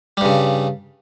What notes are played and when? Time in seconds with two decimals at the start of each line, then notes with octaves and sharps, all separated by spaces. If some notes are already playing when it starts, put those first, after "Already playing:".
0.17 G3
0.21 G2
0.25 C#3